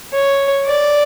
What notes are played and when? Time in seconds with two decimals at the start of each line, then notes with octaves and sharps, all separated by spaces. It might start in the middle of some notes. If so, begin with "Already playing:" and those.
0.13 C#5
0.65 D5